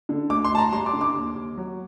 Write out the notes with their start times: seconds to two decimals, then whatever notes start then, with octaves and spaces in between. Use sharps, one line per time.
0.09 D3
0.30 D2 D6
0.44 C6
0.51 D2 A5
0.58 A#5
0.72 G3 C6
0.86 D6
0.93 D3
1.01 D6
1.14 D#2
1.35 D#2
1.57 F#3